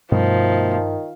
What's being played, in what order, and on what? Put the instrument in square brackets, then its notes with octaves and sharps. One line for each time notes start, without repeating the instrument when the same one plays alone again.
[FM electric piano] G2 [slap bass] B2 A3 [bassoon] D#3 [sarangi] F3